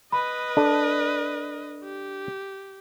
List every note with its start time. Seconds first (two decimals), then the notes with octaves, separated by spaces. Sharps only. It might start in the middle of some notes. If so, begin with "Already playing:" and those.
0.12 B4 D#5 B5
0.57 D4 A4
1.84 G4